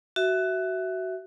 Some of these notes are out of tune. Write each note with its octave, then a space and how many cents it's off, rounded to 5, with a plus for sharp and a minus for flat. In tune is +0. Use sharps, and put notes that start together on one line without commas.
F#4 +20 E5 +0